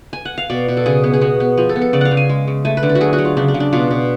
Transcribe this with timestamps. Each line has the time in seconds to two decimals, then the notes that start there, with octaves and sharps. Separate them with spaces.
0.13 G#5
0.25 F#5
0.38 F5
0.50 B2 D5
0.68 B2
0.77 A4
0.86 C#3 G#4
1.04 B3
1.13 G#4
1.21 B3 F#4
1.40 B3
1.57 F3 G#4
1.69 A4
1.76 B3
1.81 A4
1.93 C#3 D5
2.01 F5 F#5
2.11 C#3
2.17 G#5
2.29 G#3
2.47 C#3
2.65 A3 G#5
2.77 B4
2.83 D3
2.89 A4
2.95 F#4
3.01 F#3 G#4
3.13 F#4
3.18 F#3
3.25 F4
3.37 C#3 D4
3.48 D4
3.54 C#3
3.60 D4
3.73 B2 F4
3.90 B2